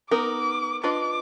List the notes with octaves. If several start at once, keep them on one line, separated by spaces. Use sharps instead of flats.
B3 D#4 A#4 D6
D4 F4 B4 D#5 D6